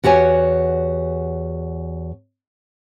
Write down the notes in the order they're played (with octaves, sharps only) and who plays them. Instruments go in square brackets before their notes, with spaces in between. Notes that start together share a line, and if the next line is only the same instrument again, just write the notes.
[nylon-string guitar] E2 F#4 G4 C#5 G#5